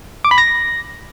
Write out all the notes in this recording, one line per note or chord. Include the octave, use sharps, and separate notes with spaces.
D6
B5
A#6